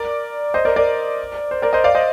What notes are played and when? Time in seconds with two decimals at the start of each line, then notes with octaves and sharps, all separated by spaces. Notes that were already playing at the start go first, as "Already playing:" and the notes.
Already playing: A#4 D5
0.54 C5 D#5
0.65 A#4 D5
0.76 A#4 D5
1.51 C5
1.62 A#4 D5
1.73 C5 D#5
1.84 D5 F5
1.95 C5 D#5